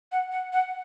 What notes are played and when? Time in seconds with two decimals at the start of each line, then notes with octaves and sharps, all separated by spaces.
0.12 F#5
0.32 F#5
0.53 F#5